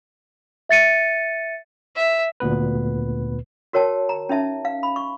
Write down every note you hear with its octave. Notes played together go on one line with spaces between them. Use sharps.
E5 A6 C#7 D#7
E5
D2 A#2 B3 B4
F#4 A#4 C#5 G5 A5
A#5
C#4 D#4 E5 A5
F5
B5
C#6